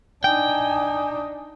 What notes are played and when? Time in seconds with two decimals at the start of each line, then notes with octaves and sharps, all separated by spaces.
0.24 D4 D#4 G5 G#5